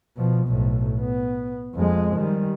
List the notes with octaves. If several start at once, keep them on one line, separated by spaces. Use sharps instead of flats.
B2 F3
B1 A2
B3
F2 G#3
D#3 G3